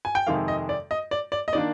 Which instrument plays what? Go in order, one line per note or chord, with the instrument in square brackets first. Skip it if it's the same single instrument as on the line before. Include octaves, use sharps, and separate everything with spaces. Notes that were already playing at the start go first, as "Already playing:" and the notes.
[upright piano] G#5
G5
F2 C3 D#3 G#3 F5
D#5
D5
D#5
D5
D5
D#5
D#3 A#3 D4 D5